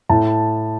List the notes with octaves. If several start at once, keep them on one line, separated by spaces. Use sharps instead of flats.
A2 A5